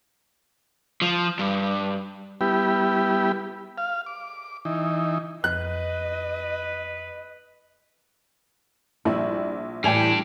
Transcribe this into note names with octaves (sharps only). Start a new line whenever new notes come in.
F3
G2
G3 B3 E4 G4
F5
D6
E3 D#4
F2 B4 D#5 F#6
A#1 G3 E4
A2 E3 G3 D4 G5 G#5 F7